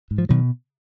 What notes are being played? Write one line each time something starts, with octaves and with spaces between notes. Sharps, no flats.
G#2
F3
B2 D#3 F#3